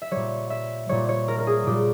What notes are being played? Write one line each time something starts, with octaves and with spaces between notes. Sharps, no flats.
E5
A#2 G3 C#5
E5
A#2 G3 C#5
C#5
A#4
A#4
G#4
A#2 G3 G4